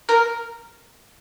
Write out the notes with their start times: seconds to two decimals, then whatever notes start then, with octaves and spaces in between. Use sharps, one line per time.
0.09 A#4